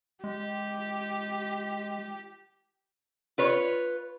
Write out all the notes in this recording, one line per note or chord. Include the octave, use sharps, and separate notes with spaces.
G#3 G4
F4 B4 C#5